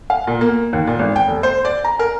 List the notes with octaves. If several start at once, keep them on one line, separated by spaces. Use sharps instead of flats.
F5
A#2
A#3
D#2
A#2
G#1
G5
F1
C5
D5
A#5
A#4